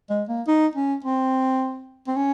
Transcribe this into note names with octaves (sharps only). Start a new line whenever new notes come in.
G#3
A#3
D#4
C#4
C4
C4
C#4